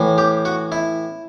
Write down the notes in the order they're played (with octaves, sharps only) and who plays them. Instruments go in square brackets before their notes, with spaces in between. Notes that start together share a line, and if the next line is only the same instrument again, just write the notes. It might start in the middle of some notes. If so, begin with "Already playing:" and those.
Already playing: [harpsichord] A2 E3
G4
F#4
E4